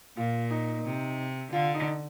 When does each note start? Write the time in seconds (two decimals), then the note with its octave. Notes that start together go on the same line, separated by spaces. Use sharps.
0.17 A#2 F4
0.51 D#4
0.85 C3
1.52 D3 F4
1.74 D#4